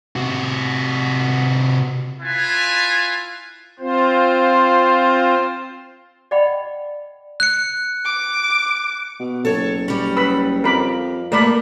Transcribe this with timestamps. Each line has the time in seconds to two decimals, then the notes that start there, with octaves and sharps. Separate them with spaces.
0.16 C3 F#4
2.21 E4 F4 B4 G#5 A5
3.80 C4 F4 C5
6.31 D5 D#5 F#5 G5 B5
7.40 F#6 C#7
8.05 D6
9.20 B2
9.45 F#1 A4 C#5
9.88 G3 C#4
10.17 B4 B5 E6
10.64 F2 A#4 B5 D6
11.32 G2 A3 A#3 A#4 D5 B5